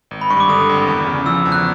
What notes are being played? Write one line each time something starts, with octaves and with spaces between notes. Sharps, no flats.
G#1
B5
G2 C#6
D6
D3 D#6
G#1
E2
C#3
F3 E6
E2
F#6